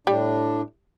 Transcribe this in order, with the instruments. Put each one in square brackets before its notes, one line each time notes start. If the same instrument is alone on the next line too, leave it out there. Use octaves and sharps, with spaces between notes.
[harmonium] A2 D4 [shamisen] G3